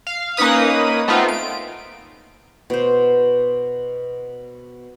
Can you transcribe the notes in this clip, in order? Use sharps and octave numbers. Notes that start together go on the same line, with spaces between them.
F5
A#3 C#4 D#4 B4 D#6
A3 B3 C4 D#4 F4
D7
B2 C5